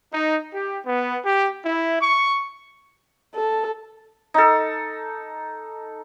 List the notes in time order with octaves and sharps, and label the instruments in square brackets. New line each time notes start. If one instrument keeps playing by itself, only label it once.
[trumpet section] D#4
G4
B3
G4
E4
C#6
[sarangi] A4
[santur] D#4 A4